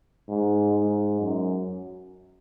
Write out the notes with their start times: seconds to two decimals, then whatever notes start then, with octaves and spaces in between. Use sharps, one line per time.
0.29 G#2
0.74 G#2
1.20 F#2